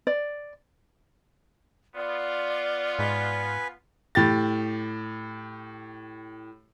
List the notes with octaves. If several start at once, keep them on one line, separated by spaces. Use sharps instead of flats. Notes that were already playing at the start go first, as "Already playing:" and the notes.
D5
B3 F4 D5
G#2 B4 G#5
A2 G4 A6